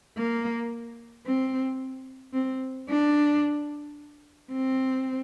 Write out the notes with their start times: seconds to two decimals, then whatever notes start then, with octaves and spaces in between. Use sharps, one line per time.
0.17 A#3
1.26 C4
2.33 C4
2.89 D4
4.52 C4